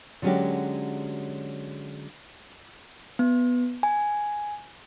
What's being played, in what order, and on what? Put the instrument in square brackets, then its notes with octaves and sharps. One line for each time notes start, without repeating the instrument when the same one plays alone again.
[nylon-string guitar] D3 F#3 G#3 C#4 F#4 G4
[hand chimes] B3
G#5